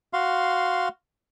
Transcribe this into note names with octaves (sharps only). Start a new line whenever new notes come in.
F#4 F5 C6